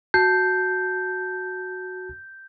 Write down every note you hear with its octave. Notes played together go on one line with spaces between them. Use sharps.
F#4 A5 G6 C7